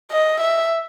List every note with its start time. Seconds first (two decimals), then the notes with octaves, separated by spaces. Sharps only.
0.11 D#5
0.41 E5